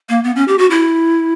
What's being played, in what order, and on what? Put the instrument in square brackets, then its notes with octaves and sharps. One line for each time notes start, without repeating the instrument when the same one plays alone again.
[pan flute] A#3
B3
C#4
G4
F#4
E4